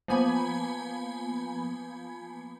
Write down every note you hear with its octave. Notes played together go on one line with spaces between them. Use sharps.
F3 A#3 B3 G#5 B5 G#6